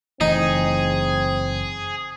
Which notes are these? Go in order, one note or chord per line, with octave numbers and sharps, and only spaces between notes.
F#1 E3 A3 C4 D#4 G#4